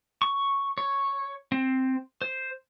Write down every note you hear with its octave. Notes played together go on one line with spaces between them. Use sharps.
C#6
C#5
C4
C5